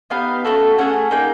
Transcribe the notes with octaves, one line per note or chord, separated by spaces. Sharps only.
B3 D#4 G4 F5
A3 C#4 F#4 A4
A3 C#4 G#4 F#5
A#3 D#4 G#4 G5